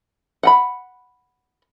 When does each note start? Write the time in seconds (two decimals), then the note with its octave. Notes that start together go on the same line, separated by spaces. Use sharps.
0.43 F#5 G5 B5